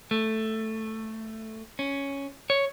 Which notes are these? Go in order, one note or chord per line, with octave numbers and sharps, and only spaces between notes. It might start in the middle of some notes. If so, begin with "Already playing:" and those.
A3
C#4
C#5